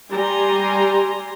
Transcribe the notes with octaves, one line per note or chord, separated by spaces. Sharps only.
G3 G4 G#5 A#5 C6